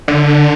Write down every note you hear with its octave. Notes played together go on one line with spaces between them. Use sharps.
D3